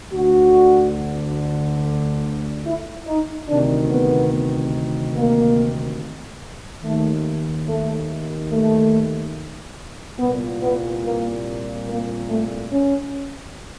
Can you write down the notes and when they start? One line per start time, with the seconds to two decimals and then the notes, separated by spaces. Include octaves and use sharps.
0.13 D2 D3 F#4
2.65 E4
3.07 D#4
3.48 D2 C3 D#3 D4
3.91 B3
5.16 A#3
6.84 D#2 D#3 A3
7.68 A3
8.51 A3
10.19 C2 A#2 B3
10.61 B3
11.04 A#3
11.88 A#3
12.29 A3
12.72 C#4